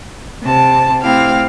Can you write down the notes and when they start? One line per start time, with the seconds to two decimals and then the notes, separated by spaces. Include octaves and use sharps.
0.43 C3 C4 A5
1.01 A3 C4 E4 G4 F5